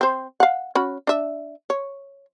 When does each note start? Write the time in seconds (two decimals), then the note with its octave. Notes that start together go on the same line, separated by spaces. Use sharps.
0.01 C4 C5
0.40 F5 F#5
0.75 C#4 F#4 B5
1.07 D4 E5
1.70 C#5